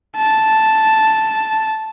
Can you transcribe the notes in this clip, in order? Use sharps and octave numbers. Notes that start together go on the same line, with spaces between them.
A5